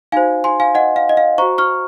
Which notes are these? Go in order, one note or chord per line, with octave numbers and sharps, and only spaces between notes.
D#4 F#4 C5 F5 G#5
G#5 C6
F5 G#5
D#5 F#5
F5
D#5
F5
F#4 C5 A#5 C#6
C#6 F6